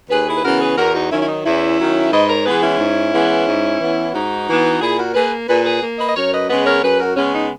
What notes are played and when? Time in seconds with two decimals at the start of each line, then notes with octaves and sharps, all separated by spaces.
0.10 D#2 G#4 B4
0.27 E4 G#4
0.37 B4
0.44 C#3 E3 B3 F#4 A#4
0.60 G#4 B4
0.78 E2 F#4 A#4
0.94 D#4 F#4
1.11 D#3 F#3 C#4 E4
1.21 E4
1.28 D#4
1.45 E2 C#4 E4
1.79 D#3 F#3
2.12 G#2 B4 D#5
2.28 A#4 C#5
2.46 E3 G#3 B3 G#4 B4
2.63 C#4 E4
2.79 G#2
3.13 E3 G#3 B3
3.47 G#2
3.81 E3 B3
4.14 G#2 D#4 F#4
4.48 E3 B3
4.81 A#2 E4 G#4
4.98 F#4 A#4
5.14 A#3 G#4 B4
5.48 A#2 G#4 B4
5.65 G#4 B4
5.82 A#3
5.98 B4 D#5
6.09 D#5
6.16 F#2 A#4 C#5
6.32 B4 D#5
6.49 C#3 G#3 B3 B4 D#5
6.66 A#4 C#5
6.82 F#2 G#4 B4
7.00 F#4 A#4
7.16 C#3 G#3 B3 C#4
7.33 D#4